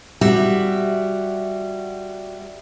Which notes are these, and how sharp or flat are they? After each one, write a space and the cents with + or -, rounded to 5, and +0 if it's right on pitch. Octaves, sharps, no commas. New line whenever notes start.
G3 +0 F#4 +0 E5 +0